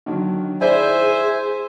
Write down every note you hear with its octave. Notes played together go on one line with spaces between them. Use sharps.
D3 D#3 F#3
E4 G#4 C5 D5 E5 G#5